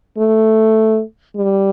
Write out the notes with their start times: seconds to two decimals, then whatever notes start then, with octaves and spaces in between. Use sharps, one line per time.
0.18 A3
1.37 G3